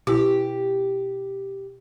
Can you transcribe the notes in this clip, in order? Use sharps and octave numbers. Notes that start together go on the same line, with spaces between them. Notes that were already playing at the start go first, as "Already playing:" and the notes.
B2 E4 G4